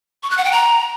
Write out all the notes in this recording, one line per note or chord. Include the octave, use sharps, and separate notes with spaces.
C#6
F#6
F#5
G5
A#5